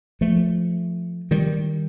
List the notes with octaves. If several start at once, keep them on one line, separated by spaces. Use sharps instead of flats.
F3 A3
D#3 G3